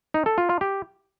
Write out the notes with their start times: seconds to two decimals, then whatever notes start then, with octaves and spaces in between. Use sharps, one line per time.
0.14 D#4
0.26 A4
0.38 F4
0.49 F4
0.61 G4